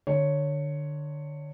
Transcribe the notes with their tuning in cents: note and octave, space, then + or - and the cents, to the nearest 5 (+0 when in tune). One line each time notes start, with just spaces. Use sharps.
D3 +25 C#5 +0